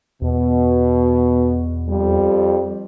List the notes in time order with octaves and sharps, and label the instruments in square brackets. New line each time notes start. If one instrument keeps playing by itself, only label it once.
[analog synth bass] E2 [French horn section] B2
[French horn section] F2 G3